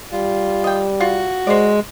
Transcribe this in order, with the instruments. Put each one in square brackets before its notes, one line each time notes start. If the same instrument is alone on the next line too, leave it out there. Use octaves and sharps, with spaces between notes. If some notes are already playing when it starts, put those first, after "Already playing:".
[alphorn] G3 [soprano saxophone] F4
[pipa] D#5 G5
[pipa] F4 [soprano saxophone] F#4
[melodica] G#3 [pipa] C5 D5